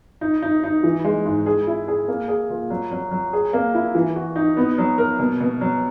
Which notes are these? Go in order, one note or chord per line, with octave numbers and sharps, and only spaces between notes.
D#4
D#4
D#4
E3
G#3
G#2
G#4
E4
G#4
A#3
G#4
A#2
F#3
F#3
F#3
G#4
A#3
E4
E3
F#4
D#4
B3
F#3
A#4
B2
B2
F#3